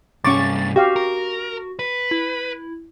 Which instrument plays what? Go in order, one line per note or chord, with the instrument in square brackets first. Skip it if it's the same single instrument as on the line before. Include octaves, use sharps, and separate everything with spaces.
[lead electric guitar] C2 G2 [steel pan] C#4 C#6 D6 [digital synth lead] A6
[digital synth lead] F#4 [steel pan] G4 F5
[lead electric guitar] A#4
B4
[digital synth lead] E4